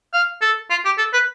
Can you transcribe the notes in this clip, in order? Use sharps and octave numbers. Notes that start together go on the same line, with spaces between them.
F5
A4
F4
G4
A4
B4